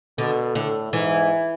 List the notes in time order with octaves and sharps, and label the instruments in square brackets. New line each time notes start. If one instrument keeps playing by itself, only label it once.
[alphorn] B2 [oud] D3
[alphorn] A2 [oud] D3
[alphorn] G#2 [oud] E3